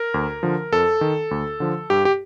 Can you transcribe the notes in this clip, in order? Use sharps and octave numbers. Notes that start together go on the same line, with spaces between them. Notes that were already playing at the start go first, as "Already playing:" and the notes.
Already playing: A#4
D2
D3 F3
F2 A4
D#3
D2
D3 F3
G2 G4
G4